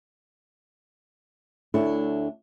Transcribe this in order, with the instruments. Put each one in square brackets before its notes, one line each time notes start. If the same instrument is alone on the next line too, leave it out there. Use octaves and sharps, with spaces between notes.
[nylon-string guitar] D2 D4 E4 A4 C#5